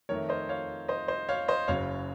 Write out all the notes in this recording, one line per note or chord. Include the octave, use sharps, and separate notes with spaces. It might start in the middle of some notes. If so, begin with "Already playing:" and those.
F2 D#3 A3 A#4 C#5
C5 D#5
C#5 F5
C5 D#5
C5 D#5
C#5 F5
C5 D#5
F#1 F#2 C#3 C#5 F5